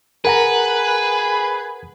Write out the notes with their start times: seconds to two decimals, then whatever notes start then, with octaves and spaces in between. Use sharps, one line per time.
0.25 G#4 A#4 B4 F#5 A#5